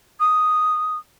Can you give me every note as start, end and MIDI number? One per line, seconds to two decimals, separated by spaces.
0.19 0.97 87